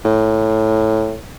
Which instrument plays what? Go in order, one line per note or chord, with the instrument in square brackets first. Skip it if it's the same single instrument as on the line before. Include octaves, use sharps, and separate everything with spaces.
[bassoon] A2